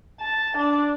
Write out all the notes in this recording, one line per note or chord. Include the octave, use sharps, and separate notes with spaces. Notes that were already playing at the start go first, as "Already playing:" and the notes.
A5
D4